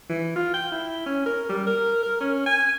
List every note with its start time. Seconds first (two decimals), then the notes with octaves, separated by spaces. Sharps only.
0.09 E3
0.36 F4
0.54 G5
0.72 E4
1.06 C#4
1.26 A#4
1.49 G3
1.67 A#4
2.03 A#4
2.20 C#4
2.46 G#5